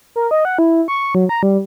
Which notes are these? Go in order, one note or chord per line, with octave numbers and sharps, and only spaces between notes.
A#4
D#5
F#5
E4
C#6
F#3
A#5
G3